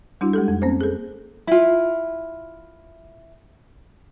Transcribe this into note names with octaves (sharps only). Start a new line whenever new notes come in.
G3 D4 E4 F#4
G#3 G4 A4
F2
A#3 C4 C#4 C5
G#4 A4
E4 F4